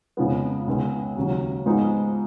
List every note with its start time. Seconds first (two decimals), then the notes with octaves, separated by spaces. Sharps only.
0.17 F2 C#3 F3 G#3 B3
0.67 C#2 C#3 G#3 B3
1.16 D#2 C#3 F#3
1.66 G#2 F3 G#3 B3 D#4